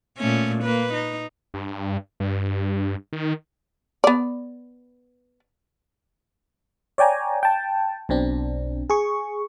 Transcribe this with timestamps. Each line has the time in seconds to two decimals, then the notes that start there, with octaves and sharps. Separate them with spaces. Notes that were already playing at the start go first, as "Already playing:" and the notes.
0.18 A#2 A3 C#4
0.64 A#3 B4
0.93 D#4
1.54 G2
2.20 G2
3.13 D#3
4.04 B3 D5
6.98 C#5 D5 G5 G#5 A#5
7.43 G5 A5
8.09 B1 B2 C4 D4
8.90 G#4 C#6